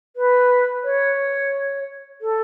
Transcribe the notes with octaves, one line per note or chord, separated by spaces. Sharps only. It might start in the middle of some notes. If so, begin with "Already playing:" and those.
B4
C#5
A4